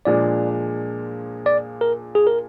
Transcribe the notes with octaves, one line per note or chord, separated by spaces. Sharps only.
A#2 F3 G#3 D4 D5
D5
A#4
G#4
A#4